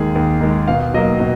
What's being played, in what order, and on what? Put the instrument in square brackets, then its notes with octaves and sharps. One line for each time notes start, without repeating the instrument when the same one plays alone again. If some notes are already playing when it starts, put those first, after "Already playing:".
Already playing: [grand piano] D#2 D#3 G#3 G#4
D#2
D#3 G#3
B2 F5
F#3 A#3 D#5
B2